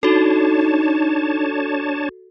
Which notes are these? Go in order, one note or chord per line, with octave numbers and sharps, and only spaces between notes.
D4 D#4 F#4 A4 C#5 A5